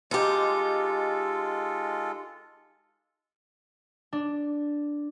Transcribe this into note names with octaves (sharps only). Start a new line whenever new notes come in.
G#3 D#4 F4 G4 A4
D4